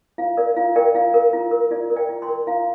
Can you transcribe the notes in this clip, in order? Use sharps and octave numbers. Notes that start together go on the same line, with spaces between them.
F4 F5
A#4 D5
F4 F5
A#4 D5 G5
F4 F5
A#4
F4
A#4
F4 D5
A#4
D5 G5
F4
G5 C6
A#4
F4 F5 A#5